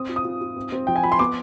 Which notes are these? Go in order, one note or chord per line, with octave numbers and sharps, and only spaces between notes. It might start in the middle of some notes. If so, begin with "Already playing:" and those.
Already playing: C4 D#6
F4
D#6
F4
F4
C4
C4
F3 G5
G#5
F4 B5
C6
B3 D6